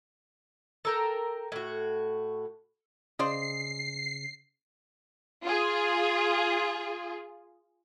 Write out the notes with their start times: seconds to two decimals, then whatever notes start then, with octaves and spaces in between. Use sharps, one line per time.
0.85 A4 A#4 G5
1.52 A2 F#4
3.19 C#3 C#4 C5 D5 D#5 C7
5.44 F4 G#4